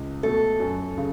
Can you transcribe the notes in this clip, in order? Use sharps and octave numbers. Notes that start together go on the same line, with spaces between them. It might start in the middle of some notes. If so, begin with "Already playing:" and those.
Already playing: C#2
B2 A3 A4
F#2
C#3